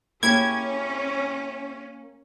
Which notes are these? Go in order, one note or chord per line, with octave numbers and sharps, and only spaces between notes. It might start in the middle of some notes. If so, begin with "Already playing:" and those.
A#3 C#4 E4 G4 G#4 G5 G#6